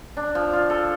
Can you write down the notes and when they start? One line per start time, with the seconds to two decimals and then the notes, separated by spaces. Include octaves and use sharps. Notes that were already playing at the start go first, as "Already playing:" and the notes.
0.17 D4
0.35 F3
0.53 F4
0.70 A4